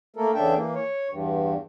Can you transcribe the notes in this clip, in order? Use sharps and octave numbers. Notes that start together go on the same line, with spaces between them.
A3 A#3 A4 A#4
E2 C#3 D4 A4 E5 G5
E3 A#3
C#5
E2 G2